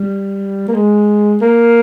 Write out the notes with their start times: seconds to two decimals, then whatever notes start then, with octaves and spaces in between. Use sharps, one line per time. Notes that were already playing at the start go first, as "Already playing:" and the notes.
Already playing: G3
0.68 A#3
0.74 G#3
1.42 A#3